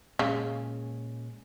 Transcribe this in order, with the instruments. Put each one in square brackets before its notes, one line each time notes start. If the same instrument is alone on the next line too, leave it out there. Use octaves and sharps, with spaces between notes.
[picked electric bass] A#2 G#3 C#4 [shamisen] C#3